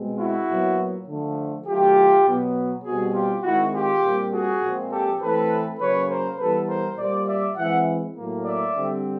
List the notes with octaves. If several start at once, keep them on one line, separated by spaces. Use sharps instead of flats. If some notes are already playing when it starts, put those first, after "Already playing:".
Already playing: B2 G#3 C4
E4 F#4
A#2 F#3 B3
D3 F3 A3
D#3 F#3 A3 F4 G4
B2 F#3 B3
B2 G3 C4 F#4 G#4
F4 G4
D#3 G#3 C4 E4 F#4
F4 G4
A#2 G3 C4
F#4 G#4
A#2 F3 G#3 C4
G4 A4
E3 A3 C4 A4 B4
C#3 F#3 A#3 B4 C#5
A#4 C5
E3 G3 B3 A4 B4
A#4 C5
A#2 G3 A#3 C5 D5
D5 E5
E3 G#3 C4 E5 F#5
A2 F#3 A#3
D5 E5
D3 G3 C4